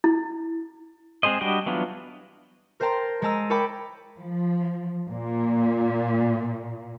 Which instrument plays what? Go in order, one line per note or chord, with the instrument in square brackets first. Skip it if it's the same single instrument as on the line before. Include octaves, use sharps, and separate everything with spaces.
[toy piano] E4
[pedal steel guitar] G#3 C4 G#4 C5 D#5
G3 D4 F#4 D#5 G5
E3 F#3 B3 D4 F4
[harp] A#4 C5 G5 A5 A#5 C6
G#3 C5 A5 A#5 E6 D#7
A#4 C#5 G5 A5 B5 D6
[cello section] F3
A#2